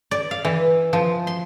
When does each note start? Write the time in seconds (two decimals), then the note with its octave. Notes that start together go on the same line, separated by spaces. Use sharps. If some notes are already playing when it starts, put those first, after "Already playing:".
0.11 D5
0.31 F5
0.45 E3
0.93 F3
1.27 C6